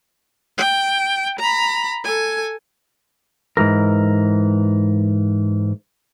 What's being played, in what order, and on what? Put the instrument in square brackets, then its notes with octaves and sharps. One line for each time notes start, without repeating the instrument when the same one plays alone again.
[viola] G5
A#5 B5
A4 G#5
[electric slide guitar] G#2 D#3 E3 A#4